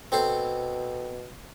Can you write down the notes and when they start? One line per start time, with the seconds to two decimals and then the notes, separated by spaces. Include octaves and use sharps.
0.12 B2 C4 A4 C5